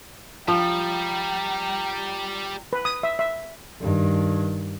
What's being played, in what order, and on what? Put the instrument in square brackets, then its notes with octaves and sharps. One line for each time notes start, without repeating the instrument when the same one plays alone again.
[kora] F3 [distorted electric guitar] G3 [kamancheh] G5 A#5
[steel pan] B4
D#6
E5
E5
[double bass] G2 D#3